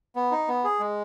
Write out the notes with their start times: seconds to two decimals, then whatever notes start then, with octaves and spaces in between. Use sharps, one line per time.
0.16 B3
0.31 D#4
0.48 B3
0.64 G#4
0.79 G#3